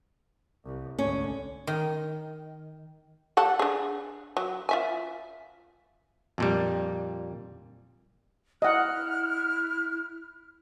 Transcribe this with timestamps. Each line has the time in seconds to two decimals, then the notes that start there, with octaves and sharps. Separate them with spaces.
0.65 C2
0.98 G#1 D2 C#4
1.67 D#3
3.37 G3 A4 F#5
3.59 D4 G#4
4.37 F#3
4.69 F4 E5 G#5
6.38 F2 A#2 G3
8.62 E4 D#5 F#5 F6 F#6